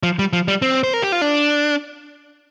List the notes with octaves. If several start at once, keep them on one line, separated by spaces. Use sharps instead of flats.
F3
G3
F3
G3
C4
C5
A#4
G4
F4
D4